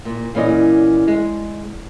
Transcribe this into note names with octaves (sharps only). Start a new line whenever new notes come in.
A#2
A#2 E3 C#4 D5 D#5
G#3